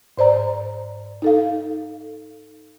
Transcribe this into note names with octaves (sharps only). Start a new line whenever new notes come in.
G#2 C5 D5 A#5
D#4 A4 F5